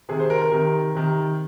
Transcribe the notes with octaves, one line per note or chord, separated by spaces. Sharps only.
C3 D#3 G#4
C5
A#4
A#4
C3 D#3
C3 D#3